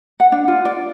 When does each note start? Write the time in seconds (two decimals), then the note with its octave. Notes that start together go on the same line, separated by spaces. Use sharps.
0.20 F#5
0.32 D4
0.48 F4
0.65 D5